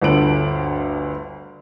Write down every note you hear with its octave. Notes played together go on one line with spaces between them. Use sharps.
G1 D2 A4 D7 F#7